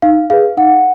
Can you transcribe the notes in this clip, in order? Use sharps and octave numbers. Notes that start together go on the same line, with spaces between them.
D#4 F5
G#4 B4 F5
D#4 F#5